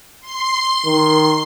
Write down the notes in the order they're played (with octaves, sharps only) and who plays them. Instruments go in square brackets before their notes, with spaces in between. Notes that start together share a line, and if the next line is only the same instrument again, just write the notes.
[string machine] C6 C7
[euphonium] D#3